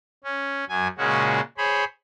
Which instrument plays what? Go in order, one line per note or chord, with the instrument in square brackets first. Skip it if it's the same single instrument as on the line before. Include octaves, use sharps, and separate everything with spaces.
[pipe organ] C#4
F#2 F#3 G#5
A#2 C#3 G#3 C#4 F#4
G#4 C5 C#5 B5